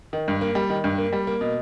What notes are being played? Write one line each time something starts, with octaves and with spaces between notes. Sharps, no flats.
D#3
G2
A#3
G3
D#3
G2
A#3
G3
A#3
B2